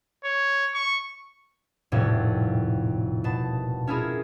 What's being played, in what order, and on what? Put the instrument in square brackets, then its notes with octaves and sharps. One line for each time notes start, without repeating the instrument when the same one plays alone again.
[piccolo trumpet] C#5
C#6
[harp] D#1 F2 A2 C3 C#5
B2 A5
C#4 E4 F4 G#4 A#4